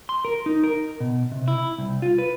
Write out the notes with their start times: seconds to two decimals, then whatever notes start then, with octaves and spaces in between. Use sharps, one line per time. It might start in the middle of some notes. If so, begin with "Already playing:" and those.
0.09 C6
0.25 A#4
0.46 D#4
0.64 A#4
1.00 B2
1.32 C3
1.48 E4
1.78 C2
2.02 F4
2.18 B4